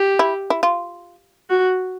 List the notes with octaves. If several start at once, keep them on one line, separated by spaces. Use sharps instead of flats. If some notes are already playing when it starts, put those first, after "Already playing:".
Already playing: G4
E4
E4
F4
F#4